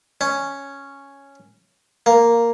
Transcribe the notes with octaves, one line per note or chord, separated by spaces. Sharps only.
C#4
A#3